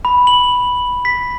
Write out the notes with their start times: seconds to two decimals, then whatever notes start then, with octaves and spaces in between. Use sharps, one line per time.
0.05 B5
0.27 F#7
1.05 B6